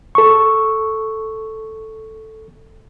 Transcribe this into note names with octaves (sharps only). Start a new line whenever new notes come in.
A4 C#6